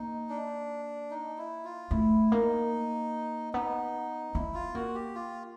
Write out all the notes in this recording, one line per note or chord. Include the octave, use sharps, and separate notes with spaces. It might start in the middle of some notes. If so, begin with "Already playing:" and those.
Already playing: A#3 D#4
D4
D#4
E4
F4
A3 E4
A#3 D#4
B3 D#4
B3 E4
F4
A#3 F#4
G4
F4